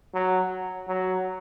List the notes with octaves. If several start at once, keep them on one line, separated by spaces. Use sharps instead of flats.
F#3
F#3